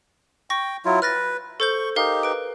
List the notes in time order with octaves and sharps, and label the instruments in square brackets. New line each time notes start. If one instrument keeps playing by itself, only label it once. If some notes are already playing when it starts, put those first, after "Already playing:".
[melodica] G5 [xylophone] C#6 A#6
[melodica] F#3 E4 F4
[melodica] B4 [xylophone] F6 A6 A#6
[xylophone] A4 C5 G6 [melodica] C#6
[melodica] D#4 G4 [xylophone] A#4 F5
[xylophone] B4 D7